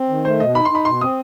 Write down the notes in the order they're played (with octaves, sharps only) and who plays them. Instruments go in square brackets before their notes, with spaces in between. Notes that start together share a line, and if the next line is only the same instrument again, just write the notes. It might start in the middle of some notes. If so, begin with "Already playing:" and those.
Already playing: [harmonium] C4
D#3
[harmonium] A3 [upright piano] C5
[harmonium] B2 [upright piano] D#5
[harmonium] D#4 [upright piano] B5
[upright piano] C6
[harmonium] D#4 [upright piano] B5
[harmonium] B2 [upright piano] C6
[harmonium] C4 [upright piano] D#6